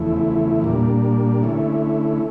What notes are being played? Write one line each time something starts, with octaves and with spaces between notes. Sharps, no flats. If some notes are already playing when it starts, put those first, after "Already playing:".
Already playing: E2 C#3 F3 A3 E4
A#2 G3 A#3 D4
D3 A3 C#4 E4